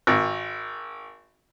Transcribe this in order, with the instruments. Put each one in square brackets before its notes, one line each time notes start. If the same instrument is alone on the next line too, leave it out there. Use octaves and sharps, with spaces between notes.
[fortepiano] G#1